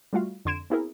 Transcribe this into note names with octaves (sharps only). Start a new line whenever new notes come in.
G3 A3 F4 F#4 F5
F2 D3 C6 G#6 D7 E7
B3 C4 E4 F#4 G#4 A#4